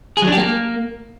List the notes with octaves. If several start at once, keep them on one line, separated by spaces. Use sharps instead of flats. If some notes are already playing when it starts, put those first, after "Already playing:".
G#4
F#3
D4
G4
A#3